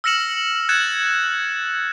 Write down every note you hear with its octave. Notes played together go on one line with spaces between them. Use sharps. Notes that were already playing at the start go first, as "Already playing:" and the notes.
E6 F6 A#6 C#7 E7 F#7
F#6 G#6 A6 C#7 E7